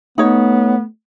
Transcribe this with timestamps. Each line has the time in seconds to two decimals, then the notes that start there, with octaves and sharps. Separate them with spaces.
0.18 A3 B3 D#4 C#5